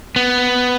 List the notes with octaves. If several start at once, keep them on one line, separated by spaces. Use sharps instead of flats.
B3